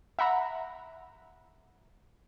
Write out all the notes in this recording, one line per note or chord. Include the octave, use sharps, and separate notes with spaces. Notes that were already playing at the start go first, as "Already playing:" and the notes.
E5 F#5 A#5 B5